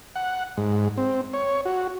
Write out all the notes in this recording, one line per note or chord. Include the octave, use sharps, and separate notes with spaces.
F#5
G#2
C4
C#5
F#4